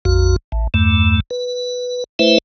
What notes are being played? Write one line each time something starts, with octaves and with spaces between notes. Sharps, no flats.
A#1 F2 F#4
A1
E2 G2 A3
B4
A3 E4 B4 C5 E5